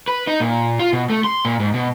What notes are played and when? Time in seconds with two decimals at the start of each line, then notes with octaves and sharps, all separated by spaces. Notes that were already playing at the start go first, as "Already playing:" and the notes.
0.08 B4
0.27 D#4
0.40 A#2
0.80 F4
0.93 B2
1.10 A3
1.24 C6
1.45 A#2
1.60 G#2
1.74 B2